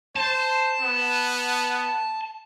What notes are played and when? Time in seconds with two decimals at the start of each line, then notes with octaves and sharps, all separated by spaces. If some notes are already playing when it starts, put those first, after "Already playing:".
0.16 C5 A5
0.81 B3